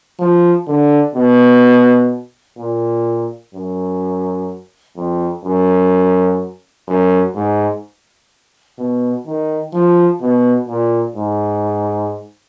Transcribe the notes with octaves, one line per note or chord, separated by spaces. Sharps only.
F3
D3
B2
A#2
F#2
F2
F#2
F#2
G#2
B2
D#3
F3
B2
A#2
G#2